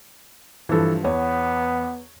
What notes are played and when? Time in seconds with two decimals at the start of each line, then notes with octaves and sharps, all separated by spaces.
0.69 G2 E3 F3 A4
1.05 E2 B3 C#5